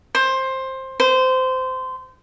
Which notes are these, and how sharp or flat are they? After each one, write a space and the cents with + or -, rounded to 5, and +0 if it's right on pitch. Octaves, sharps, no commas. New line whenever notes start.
C5 +15
C5 -20